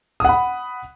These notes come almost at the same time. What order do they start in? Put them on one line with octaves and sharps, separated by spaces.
D#6 F#5 B5